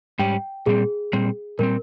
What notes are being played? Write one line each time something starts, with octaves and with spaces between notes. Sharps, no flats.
G#2 G3 C#4 G4 G5
A#2 G3 C4 G#4
A#2 G3 C4
A#2 G3 C4 A#4